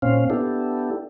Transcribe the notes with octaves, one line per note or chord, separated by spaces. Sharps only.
A#2 C4 C#4 F5
B3 D4 E4 G4 A4